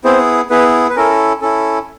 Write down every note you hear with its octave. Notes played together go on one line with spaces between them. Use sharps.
B3 C4 E4 G#4 C5
B3 E4 G#4 B4
B4
C#4 E4 A4 A#4
C#4 E4 A4